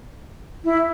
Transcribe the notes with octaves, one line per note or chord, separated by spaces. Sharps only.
E4